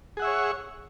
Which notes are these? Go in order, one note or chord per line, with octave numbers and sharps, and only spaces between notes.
G#4 C#5 E5 F#5 C#6